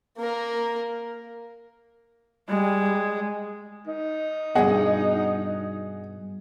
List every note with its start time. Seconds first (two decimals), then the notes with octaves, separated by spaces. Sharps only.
0.18 A#3 A#4
2.49 G3 G#3
3.87 D#4
4.55 G2 B2 G#4 D#5 F#5